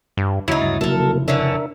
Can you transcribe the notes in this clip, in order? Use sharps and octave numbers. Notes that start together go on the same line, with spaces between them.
G2
D2 C#3 F#3 D#4 E4
G2 A6
F1 A#2 C#3 F#3 A#3 A4 A#4
D3 E3 C#4 D4 A#4 E5